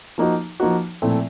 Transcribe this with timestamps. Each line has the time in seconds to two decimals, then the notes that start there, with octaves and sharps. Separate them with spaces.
0.18 F3 A#3 D#4 F#4
0.60 F3 A#3 D#4 F#4
1.02 A#2 F3 A3 C4 E4